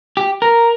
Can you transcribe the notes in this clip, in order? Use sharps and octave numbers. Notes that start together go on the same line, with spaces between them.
G4
A#4